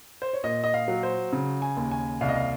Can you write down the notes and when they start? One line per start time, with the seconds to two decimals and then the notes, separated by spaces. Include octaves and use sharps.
0.22 C5
0.33 C#5
0.44 A#2 D#5
0.64 D#5
0.74 F5
0.88 F#3
1.03 C5
1.33 C#3
1.62 G#5
1.77 D#2
1.91 G#5
2.21 C2 F5
2.29 D#5
2.35 F5